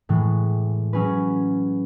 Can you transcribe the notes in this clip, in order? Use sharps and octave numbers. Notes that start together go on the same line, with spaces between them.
A2 E3 G#3
F#3 C#4 G#4 B4